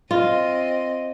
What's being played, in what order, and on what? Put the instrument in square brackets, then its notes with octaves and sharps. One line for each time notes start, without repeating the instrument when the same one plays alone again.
[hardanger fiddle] C4 D#5 [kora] F4